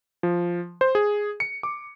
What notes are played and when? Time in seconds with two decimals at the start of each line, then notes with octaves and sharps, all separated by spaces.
0.23 F3
0.81 C5
0.95 G#4
1.40 C#7
1.63 D6